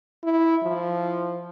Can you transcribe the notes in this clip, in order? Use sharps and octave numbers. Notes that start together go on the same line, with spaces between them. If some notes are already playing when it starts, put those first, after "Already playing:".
E4
F3